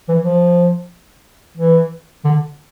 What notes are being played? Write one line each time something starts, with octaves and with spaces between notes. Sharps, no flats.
E3
F3
E3
D3